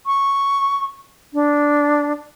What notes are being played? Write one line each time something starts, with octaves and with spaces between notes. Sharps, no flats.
C#6
D4